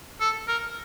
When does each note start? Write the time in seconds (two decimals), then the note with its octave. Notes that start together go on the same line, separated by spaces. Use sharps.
0.20 A4
0.48 A#4